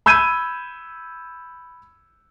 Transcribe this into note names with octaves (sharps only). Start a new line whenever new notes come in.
B5 E6 G6 G#6 D#7